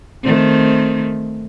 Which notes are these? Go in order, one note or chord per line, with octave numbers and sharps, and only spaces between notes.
D#3 A3 C4